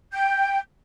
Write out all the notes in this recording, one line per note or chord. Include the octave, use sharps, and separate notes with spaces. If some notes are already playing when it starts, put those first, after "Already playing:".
G5 G6